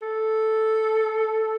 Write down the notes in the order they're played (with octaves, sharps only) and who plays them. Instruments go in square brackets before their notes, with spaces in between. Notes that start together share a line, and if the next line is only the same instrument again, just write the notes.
[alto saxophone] A4